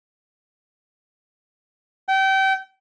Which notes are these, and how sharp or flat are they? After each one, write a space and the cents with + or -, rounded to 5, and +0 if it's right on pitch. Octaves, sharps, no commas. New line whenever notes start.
G5 -30